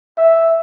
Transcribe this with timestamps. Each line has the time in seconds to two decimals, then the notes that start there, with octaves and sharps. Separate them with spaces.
0.18 E5